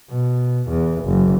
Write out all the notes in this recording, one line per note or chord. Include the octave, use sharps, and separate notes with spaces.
B2
E2
F#1